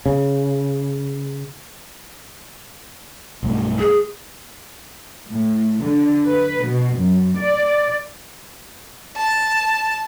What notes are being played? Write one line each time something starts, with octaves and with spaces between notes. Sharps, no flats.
C#3
B1 G2 A3
G#4
A2
D3
B4
B2
F#2
D5
A5